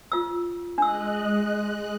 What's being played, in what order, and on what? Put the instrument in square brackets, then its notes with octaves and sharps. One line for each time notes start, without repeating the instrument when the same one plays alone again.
[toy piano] F4 E6
[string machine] G#3 D#5 F#6 [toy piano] D4 E6